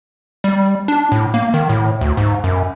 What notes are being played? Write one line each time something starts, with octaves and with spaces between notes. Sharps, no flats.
G3
D4
A2
A#3
D#3
A2
D2
G#2
F#2